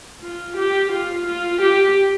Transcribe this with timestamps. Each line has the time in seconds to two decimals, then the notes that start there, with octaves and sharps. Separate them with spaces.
0.21 F4
0.56 G4
0.92 F4
1.27 F4
1.61 G4